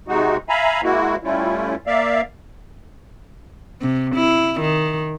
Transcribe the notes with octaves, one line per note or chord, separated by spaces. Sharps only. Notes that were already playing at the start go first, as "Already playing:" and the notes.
C3 G#3 D#4 F#4
E5 F5 G#5 A#5 B5
G#3 A#3 E4 F#4
G3 A3 C#4 E4 F4
A#3 D5 E5 F5
C3
E4
D#3